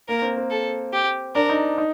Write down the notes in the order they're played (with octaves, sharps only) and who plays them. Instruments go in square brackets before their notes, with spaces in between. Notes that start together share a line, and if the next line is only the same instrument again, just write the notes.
[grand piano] A#3 [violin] A#4
[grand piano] C4
C4
[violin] A4
G4
[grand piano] D4 [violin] A#4
[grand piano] D#4
D#4